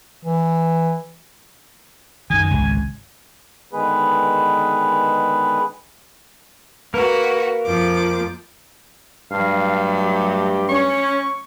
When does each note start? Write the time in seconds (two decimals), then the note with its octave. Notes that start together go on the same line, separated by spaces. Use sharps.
0.25 E3
2.30 F#2 D#3 G#5
2.51 G#1 C#2
3.73 D3 D#3 G#3 B3 G#4 B4
6.94 A#3 F#4 A#4 B4
7.65 F2 F3 D6
9.31 G2 F#3 A3 F5
10.04 G4
10.69 C#4 C#6